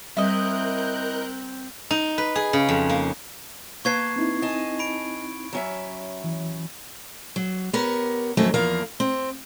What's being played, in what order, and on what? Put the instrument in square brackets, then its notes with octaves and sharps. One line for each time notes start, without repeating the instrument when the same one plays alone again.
[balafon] G3 [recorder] C4 [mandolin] E4 D#5 [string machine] A#4 F#6 G6
[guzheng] D#4
B4
G#4
C#3
F2
A#3
[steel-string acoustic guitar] A#3 B4 A5 [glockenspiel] C#6 G#6 C7
[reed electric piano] C4 D#4 E4
[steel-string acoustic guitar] D#5 G#5 A5
[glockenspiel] B5 D7
[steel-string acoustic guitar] F#3 C#4 E5
[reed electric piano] E3
[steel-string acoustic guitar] F#3
B3 G4 A#4 C#5
F2 D#3 F#3 A3 C#4
E2 F3 A#3 A#4 F5
C4